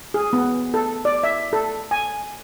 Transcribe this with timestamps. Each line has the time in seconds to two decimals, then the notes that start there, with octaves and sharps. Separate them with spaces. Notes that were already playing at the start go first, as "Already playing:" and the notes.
0.14 G#4
0.33 B3
0.74 A4
1.05 D5
1.24 E5
1.53 A4
1.91 G#5